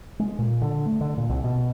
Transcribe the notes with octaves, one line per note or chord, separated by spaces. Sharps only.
G#3
A#2
D3
A3
D3
A#2
C2
B2